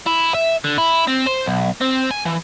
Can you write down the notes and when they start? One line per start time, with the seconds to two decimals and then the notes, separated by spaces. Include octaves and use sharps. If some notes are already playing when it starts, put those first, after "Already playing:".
0.06 E4
0.34 E5
0.64 D3
0.78 E4
1.07 C4
1.26 C5
1.46 B1
1.81 C4
2.11 G#5
2.25 E3